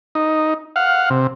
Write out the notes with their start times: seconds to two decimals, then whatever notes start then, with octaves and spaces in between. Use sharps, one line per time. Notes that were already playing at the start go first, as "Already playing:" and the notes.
0.15 D#4
0.76 F5 F#5
1.10 C3